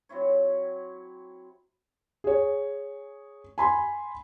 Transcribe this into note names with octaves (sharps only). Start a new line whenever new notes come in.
F#3 C4 E4 C#5
G#4 C#5
G#5 B5 C6